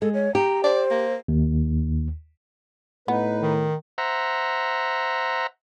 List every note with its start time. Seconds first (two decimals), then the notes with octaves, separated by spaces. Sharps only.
0.02 G#3 A4
0.14 C#5
0.35 G4 A#5
0.64 C5 D5
0.91 A#3
1.28 D#2
3.08 A2 B3 D#4 B4
3.42 D#3
3.98 C5 E5 F#5 A#5